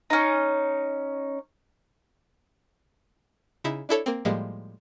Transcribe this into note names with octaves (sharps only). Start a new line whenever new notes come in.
C#4 D#4
C#3 D#4 E4
D4 E4 A4 C#5
A#3 C4
A2 F3 G3 G#3 A#3